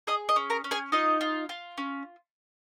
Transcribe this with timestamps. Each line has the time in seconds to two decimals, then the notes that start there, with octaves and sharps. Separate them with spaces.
0.07 G#4 D#5 D#6
0.29 D#5 D#6
0.36 C#4
0.50 A#4 A#5
0.64 C#4
0.71 G#4 G#5
0.92 D#4 F4 D#5
1.21 F4
1.49 F4
1.78 C#4